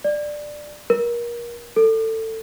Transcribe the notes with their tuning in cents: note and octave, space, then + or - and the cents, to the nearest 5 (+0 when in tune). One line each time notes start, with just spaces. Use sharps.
D5 +10
A#4 +30
A4 +20